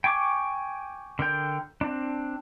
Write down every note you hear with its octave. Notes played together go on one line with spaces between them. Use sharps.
G5 G#5 C#6 D6
D3 A#4 G5
C4 D4